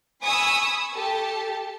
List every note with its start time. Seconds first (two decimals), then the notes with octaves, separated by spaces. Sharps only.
0.22 G#5 B5 C#6 D#6 E6
0.95 G4 A4 A5